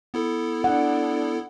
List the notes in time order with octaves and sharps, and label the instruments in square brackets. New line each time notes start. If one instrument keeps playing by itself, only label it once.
[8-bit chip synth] B3 E4 A4
[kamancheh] D4 [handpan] F#5